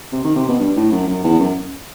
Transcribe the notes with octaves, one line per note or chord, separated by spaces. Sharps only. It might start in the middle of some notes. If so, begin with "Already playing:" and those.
C3
D#3
C3
B2
G2
A2
F#2
F#2
E2
F#2